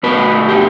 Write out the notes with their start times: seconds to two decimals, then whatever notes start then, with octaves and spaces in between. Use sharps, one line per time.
0.03 B2 A3 B4
0.49 G4